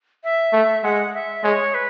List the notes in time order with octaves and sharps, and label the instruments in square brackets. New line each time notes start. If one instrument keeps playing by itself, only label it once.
[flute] E5
[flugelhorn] A3
[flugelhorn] G#3 [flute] F#5
[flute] E5
[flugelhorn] G#3 [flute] C#5
[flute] B4